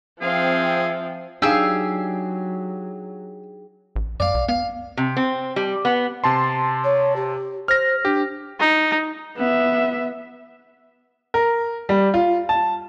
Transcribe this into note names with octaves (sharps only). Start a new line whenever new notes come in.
F3 C4 G#4 E5 F5 G5
F#3 D4 D#4 G4 G#4 F5 E6
A1
F#2 D5 F5
C2
B3 F5
C3
C4
G3
B3
C3 A5 C6
C#5
G4
C5 F6 A#6
D4 G4
D#4
B3 E5
A#4
G3
F4
A5